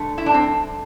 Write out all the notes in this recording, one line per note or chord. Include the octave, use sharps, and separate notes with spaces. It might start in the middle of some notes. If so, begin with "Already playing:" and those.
Already playing: G2 D3 A3
E4
D4
C4